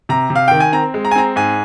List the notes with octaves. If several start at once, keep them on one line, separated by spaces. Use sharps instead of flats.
C3 A#5
C3
F5
D#3 G5
G#5
C4 A#5
G#3
A#5
G#5
C4 A#5
G#2 G#5